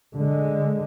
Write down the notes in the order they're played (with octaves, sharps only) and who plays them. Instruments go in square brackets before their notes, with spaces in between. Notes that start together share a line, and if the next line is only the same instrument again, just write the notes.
[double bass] D3 G#3